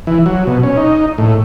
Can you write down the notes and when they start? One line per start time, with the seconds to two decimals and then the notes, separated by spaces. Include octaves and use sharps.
0.07 E3
0.26 F#3
0.47 B2
0.63 C#4
0.77 D#4
1.18 A2